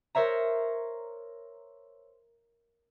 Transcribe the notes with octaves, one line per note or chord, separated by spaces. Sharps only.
A#4 C5 C#5 E5 A#5